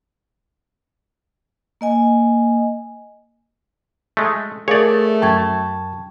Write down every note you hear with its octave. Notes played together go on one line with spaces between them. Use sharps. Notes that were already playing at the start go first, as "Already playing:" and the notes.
A#3 D#5 G#5
G#3 A3
A3 G#4 A#4 C#5 D5 F5
F#2 G5 A5 C#6 G#6